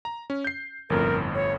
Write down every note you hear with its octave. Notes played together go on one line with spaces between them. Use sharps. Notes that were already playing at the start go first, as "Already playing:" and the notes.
A#5
C#4
G6 C7
G1 F2 A2 A#4
C#5